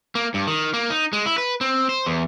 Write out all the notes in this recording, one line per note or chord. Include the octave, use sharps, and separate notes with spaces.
A#3
G2
D#3
A#3
D#4
G#3
E4
B4
C4
C5
E2